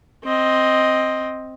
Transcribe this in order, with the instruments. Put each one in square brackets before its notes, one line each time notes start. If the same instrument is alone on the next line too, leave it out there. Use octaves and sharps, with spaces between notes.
[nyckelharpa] C4 D#5